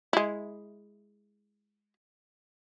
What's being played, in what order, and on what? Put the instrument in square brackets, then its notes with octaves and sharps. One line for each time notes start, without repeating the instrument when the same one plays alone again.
[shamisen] G#3 E4